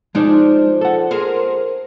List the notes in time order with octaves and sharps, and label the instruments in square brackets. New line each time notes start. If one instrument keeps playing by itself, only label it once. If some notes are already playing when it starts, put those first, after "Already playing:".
[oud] F3 D4 [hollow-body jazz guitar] G#3 D#4
[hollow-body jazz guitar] A4 F#5
[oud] G#4 A#4 C5